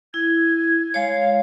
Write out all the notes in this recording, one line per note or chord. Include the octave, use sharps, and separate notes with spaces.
E4 G#6
G#3 C#5 F5